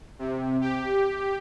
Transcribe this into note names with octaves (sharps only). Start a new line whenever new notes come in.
C3
G4